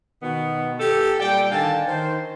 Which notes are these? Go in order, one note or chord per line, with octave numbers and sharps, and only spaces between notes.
B2 D#3 B3
G4 A4
A#2 G3 D5 G5
D3 D#3 F5 G#5 A5
D#3 C5